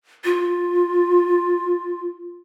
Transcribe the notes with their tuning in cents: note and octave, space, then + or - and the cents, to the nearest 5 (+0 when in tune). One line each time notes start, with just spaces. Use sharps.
F4 +10